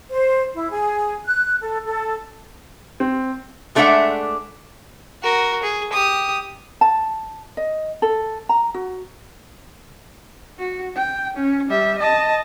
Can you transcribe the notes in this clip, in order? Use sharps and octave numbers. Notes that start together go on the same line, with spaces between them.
C5
E4
G#4
F#6
A4
A4
C4
G#3 A3 D4 D5 E5 F#5
F#4 A#4
G#4
G4 D#6
A5
D#5
A4
A#5
F#4
F#4
G5
C#4
G3 E5
D#5 A5